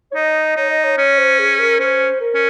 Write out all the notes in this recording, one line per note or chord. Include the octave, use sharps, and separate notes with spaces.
C#5
D#4 D#5
D#4 C#5
D#5
C#5
C#4 C#5
C5
G#4
A#4
C#4 C5
A#4
C#4